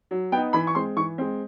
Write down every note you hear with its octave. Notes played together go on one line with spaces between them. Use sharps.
F#3
B3 D#4 G5
E3 B5
C#6
G#3 C4 C6
E3 C#6
G#3 C4